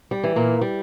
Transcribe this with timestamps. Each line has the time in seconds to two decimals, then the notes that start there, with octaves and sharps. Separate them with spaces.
0.11 G3
0.24 E3
0.36 A#2 A#3
0.61 G3